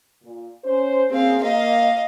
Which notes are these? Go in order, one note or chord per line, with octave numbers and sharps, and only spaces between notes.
A#2
C#4 C5
F#2 A#3 C4 G#4 F5
A#3 D#5 F5